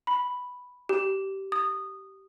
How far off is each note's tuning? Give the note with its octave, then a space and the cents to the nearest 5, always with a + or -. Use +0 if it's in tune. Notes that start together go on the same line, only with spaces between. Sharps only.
B5 +0
G4 -20
D#6 -15